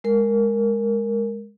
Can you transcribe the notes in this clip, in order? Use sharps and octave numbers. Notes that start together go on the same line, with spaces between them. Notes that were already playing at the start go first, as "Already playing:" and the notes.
G#3 A#4